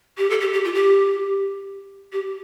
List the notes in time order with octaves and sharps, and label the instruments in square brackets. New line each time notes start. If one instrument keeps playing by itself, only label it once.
[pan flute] G4
A4
G4
G4
F4
G4
G4